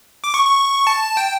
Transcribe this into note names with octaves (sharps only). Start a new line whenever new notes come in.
D6
C#6
C#6
A5
G5